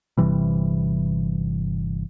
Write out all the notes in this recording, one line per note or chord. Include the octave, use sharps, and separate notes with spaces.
G1 C3 E3 G3